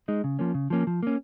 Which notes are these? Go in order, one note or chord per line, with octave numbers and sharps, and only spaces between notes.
G#3 D#4
C#3
F3 A#3 C#4
C#3
F3 A#3 C#4
F3
A#3 C#4